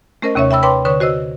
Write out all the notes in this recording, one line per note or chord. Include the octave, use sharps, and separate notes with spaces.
A3 C#4 A#4 C5 D#5
D#2 C3 C#4 C#5 E5
E5 G5 B5 E6
B4 C#5 G5 B5 C6 D6
D3 B4 C#5 C#6 D#6
F#4 C5 D#5 E6